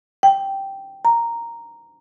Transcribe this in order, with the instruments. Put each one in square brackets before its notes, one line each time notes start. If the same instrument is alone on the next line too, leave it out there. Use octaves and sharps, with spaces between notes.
[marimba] G5
A#5